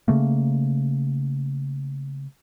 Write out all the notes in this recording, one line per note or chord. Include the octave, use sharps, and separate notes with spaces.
C#3 A3 A#3